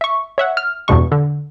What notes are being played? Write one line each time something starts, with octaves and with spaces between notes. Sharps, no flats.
E5 C#6
C#5 E5 F#5
F6
E2 G2 B2 G#3 C#6
D3